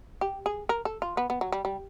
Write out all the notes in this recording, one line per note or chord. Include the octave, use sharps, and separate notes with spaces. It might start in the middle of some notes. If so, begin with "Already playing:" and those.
G4
G#4
A#4
A4
F4
B3
B3
F#3
G3
G3